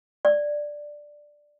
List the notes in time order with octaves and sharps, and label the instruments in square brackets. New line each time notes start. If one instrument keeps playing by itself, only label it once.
[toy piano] D5